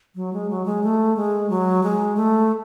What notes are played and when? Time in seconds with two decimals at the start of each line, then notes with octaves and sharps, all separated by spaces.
0.15 F#3
0.33 G#3
0.50 F#3
0.66 G#3
0.83 A3
1.16 G#3
1.50 F#3
1.83 G#3
2.17 A3